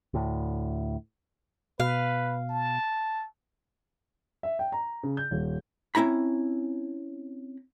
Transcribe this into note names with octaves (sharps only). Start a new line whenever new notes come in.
D2 A2
B2 B4 F5
A5
E5
G5
A#5
C#3
G6
D#1
C4 C#4 E4 A#5 B5